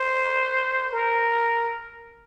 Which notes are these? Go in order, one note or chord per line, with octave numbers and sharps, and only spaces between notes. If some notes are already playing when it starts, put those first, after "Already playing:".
Already playing: C5
A#4